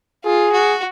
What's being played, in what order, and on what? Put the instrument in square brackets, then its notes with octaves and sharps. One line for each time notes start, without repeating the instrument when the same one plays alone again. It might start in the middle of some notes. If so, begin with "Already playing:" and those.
[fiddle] F4 [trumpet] G#4
[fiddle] F#4